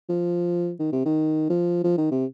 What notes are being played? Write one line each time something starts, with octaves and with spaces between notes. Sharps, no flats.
F3
D#3
C3
D#3
F3
F3
D#3
C3